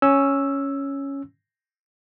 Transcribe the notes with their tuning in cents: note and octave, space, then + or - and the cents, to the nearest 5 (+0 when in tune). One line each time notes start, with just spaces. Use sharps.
C#4 +0 E6 +0